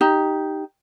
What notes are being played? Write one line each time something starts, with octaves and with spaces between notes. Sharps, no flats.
D#4 G4